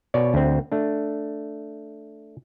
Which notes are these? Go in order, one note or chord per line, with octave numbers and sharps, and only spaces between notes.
B2 C#5 D5
D2 C4
A3 D4